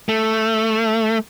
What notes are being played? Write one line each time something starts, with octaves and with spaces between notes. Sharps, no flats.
A3